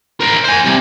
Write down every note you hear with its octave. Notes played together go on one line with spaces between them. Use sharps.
A#4 C5
C5 G#5
C3 G3